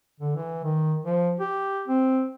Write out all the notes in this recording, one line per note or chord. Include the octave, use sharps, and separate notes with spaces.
D3
E3
D#3
F3
G4
C4